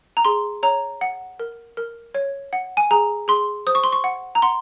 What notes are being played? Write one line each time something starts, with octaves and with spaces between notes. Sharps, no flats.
A#5
G#4 C6
C#5 A#5
F#5
A#4
A#4
C#5
F#5
G#5
G#4 A#5
G#4 C6
C5 D#6
C#6
C6
C#6
F#5
A#5
F#5 C6